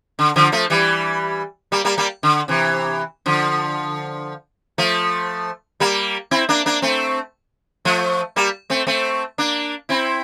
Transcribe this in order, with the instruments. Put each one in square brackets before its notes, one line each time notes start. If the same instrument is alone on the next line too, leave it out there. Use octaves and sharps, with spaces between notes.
[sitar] D3
D3 F3
F3 A3
E3 G3
G3 A#3
G3 A#3
G3 A#3
D3
C3 E3
D3 F3
F3 A3
G3 A#3
C4 E4
A#3 D4
A#3 D4
A3 C4
F3 A3
G3 A#3
A3 C4
A3 C4
A#3 D4
C4 E4